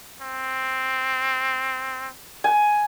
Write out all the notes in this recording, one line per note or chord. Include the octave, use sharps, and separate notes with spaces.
C4
G#5